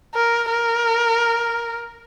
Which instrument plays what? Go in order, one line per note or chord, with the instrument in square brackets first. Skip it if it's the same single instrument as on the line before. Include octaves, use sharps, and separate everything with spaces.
[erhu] A#4
A#4